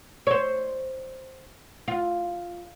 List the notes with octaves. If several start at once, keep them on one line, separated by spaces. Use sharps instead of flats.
C5 C#5
F4